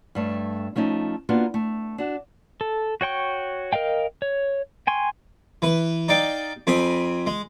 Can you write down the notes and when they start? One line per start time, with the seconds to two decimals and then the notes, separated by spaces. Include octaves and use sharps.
0.15 G2 A3 C#5
0.76 F3 A3 C#4 D#4
1.29 A#3 B3 D4 F4 F#4
1.54 A3
1.98 D4 F#4
2.61 A4
3.01 F#4 C#5 G5 C#6
3.73 A#4 D#5 F5 G5
4.22 C#5
4.87 G5 G#5 C6 C#6
5.62 E3 B4
6.08 D#4 D5 F5 G5
6.67 F2 C4 G#5 B5 D#6
7.27 G#3